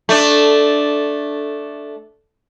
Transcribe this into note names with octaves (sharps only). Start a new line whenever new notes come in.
A3 D4